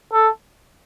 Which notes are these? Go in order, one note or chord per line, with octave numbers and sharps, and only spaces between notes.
A4